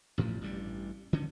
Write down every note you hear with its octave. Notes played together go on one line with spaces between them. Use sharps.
A1 A2 E3 F3
A1 G2 G3
D3 D#3 C#4